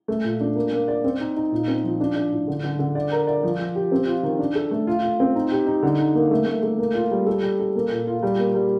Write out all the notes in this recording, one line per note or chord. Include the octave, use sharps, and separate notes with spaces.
A3
A#2
D4
A#3
A#3
D5
C4
D#4
D#4
A#2
C4
F3
D4
D4
A2
D3
D3
D3
D5
A#4
D5
F3
F3
G4
C4
F4
D#3
D4
A4
A3
F4
F4
C4
D#4
G4
D#4
D3
D#4
A#3
A3
A3
A3
A#3
F4
G3
A4
G3
A4
A#3
A#2
F4
G3
A#3
G3